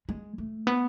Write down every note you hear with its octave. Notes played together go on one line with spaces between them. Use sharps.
G#3
A3
B3